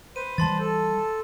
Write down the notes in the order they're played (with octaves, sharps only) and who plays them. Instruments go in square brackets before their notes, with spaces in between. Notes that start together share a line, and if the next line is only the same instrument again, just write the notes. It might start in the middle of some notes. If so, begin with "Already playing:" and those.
[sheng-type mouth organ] B4 C5 [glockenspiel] D#7
[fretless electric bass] E3 G3 [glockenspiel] A5 C6 A6
[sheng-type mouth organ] A4